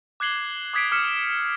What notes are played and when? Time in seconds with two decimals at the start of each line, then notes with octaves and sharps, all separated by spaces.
0.20 D6 F#6 G#6 C7 F#7 G7
0.74 D6 D#6 G#6 B6 C7 D7
0.91 D6 D#6 F6 B6 C#7 E7
1.05 E7